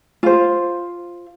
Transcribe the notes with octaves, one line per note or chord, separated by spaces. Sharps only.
F4 C5